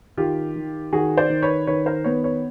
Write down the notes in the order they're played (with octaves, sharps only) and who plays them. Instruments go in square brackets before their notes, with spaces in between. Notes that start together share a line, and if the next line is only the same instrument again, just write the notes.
[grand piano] D#3 [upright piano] F4 G4
[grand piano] D#3
[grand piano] D#3 [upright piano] F#4 G#4
[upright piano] C5 D5
[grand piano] D#3
[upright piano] B4 C#5
[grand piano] D#3 [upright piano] B4 C#5
[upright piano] A#4 C5
[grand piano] B3 [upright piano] B4 C#5
[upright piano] B4 C#5